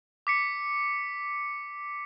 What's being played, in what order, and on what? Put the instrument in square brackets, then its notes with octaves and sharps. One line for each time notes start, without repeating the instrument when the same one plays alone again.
[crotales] D6 B6 C#7